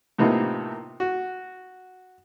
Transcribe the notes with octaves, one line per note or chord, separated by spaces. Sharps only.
A2 C3 A#3 B3 D#4 F4
F#4